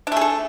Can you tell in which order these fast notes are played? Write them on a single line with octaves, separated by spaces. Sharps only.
D4 A3 G#4 A4